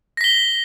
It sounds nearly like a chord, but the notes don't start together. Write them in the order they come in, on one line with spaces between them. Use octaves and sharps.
A#6 B6 G7